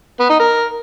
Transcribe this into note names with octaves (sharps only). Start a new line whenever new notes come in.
B3
D#4
A#4